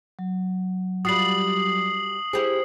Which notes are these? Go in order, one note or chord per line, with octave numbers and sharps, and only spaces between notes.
F#3
G3 F4 F#4 D#6 C7 F#7
E4 G4 G#4 C5